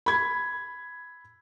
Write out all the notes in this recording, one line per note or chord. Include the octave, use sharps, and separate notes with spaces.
B5 G#6